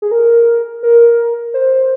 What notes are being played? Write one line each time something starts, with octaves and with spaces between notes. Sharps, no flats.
G#4
A#4
A#4
C5